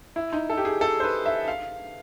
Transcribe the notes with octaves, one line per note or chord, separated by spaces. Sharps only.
E4
D#4
A4
G4
G#4
A4
C5
B4
E5
F5